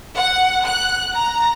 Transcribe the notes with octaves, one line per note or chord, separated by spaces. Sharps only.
F#5
F#6
A#5